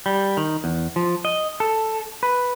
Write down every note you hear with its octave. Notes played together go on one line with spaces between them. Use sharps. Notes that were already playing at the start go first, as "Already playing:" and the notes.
G3
D#3
E2
F3
D#5
A4
B4